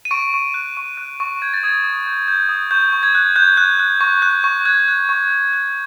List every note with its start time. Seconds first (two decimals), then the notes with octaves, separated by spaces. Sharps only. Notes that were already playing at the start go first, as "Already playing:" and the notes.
0.05 D#7
0.11 C#6 D7
0.34 C#6
0.54 F#6
0.77 C#6
0.97 F#6
1.20 C#6
1.42 G6 G#6
1.54 A6
1.63 D#6 G#6
1.84 D#6
2.07 G6
2.28 G6
2.49 D#6
2.71 C#6 G6
2.92 C#6
3.03 G#6
3.15 F#6
3.36 F#6 G6
3.57 F#6
3.80 F#6
4.01 C#6
4.22 F#6
4.44 C#6
4.65 F#6 G#6
4.88 F#6
5.09 C#6
5.30 F#6
5.53 F#6